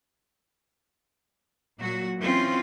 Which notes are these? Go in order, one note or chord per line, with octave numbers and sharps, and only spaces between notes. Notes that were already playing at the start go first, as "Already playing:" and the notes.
A#2 F#3 F#4
E3 C4 C#4 F4